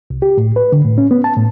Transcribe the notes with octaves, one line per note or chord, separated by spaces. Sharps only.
C2
G4
A2
B4
D3
A2
C#4
B3
A5
A2